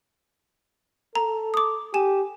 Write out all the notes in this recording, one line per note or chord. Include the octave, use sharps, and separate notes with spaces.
A4 A#5
D6 D#6
G4 G#5 E7